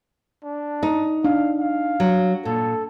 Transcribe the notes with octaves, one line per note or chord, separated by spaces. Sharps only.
D4
D#4
D4 F5
F5
F#3
A#2 A4